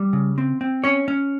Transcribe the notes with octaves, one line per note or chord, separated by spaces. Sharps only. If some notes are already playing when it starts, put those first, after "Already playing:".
Already playing: G3
C#3
C4
C4
C#4 C#5
C#4